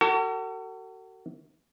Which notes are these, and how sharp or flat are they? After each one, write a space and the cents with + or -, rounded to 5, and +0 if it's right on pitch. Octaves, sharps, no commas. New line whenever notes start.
F#4 +35 A4 +45